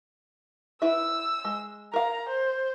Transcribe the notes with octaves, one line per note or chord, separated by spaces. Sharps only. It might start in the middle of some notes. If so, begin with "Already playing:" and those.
E4 B4 E5 E6
G#3
A#4 F5 A#5
C5